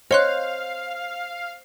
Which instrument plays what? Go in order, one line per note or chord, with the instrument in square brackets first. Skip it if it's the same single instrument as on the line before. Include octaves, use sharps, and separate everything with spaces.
[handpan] C5 [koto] C#5 [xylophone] D#5 C6 F#6 [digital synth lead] F5